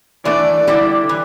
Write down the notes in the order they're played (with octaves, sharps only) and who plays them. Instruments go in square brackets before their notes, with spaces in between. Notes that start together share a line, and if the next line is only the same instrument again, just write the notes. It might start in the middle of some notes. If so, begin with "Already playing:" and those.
[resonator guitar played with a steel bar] E3 A3 D4 [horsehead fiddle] D5
[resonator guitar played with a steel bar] D3 G3 E4 G4
E3